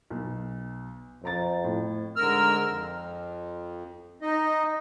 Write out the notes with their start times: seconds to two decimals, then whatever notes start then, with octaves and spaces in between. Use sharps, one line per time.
0.10 B1
1.23 F2 C4 A#5 A6
1.64 A2
2.16 G#2 D3 A#4 E6 F6
2.68 F2
4.22 D#4 D#5